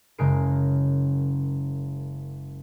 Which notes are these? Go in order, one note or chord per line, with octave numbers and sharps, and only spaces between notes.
F#1 C#3 G#3 A#4 C7 D7